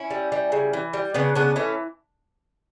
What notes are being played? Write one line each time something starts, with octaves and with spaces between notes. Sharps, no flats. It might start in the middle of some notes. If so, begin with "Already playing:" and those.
Already playing: C#4 E4
G3
G3
C#3
E3
G3
C#3 B3 D4
C#3 B3 D4
E3 A3 C#4